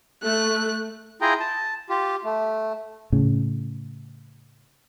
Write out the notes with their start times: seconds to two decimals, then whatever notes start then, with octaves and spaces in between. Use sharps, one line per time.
0.23 A3 F#6
1.21 E4 F4 G#4 G5 A#5
1.40 A5
1.89 F4 G4
2.24 A3
3.12 A2 C#3